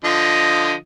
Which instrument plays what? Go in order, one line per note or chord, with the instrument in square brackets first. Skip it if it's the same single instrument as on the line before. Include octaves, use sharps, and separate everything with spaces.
[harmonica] D3 F3 D#5